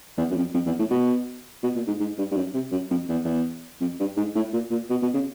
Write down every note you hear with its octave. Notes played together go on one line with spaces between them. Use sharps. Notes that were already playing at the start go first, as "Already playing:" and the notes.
E2
F#2
F2
F2
E2
A2
B2
B2
A#2
G#2
G#2
G2
G2
F#2
C3
F#2
F2
E2
E2
F2
G2
G#2
A2
A#2
A#2
B2
B2
C#3